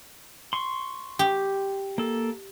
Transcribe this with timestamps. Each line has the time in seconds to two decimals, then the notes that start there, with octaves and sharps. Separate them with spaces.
0.53 C6 C#6
1.19 G4
1.98 A#3 A4